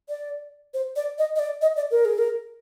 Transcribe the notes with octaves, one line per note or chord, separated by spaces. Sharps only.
D5
C5
D5
D#5
D#5
D5
D#5
D5
A#4
G#4
A#4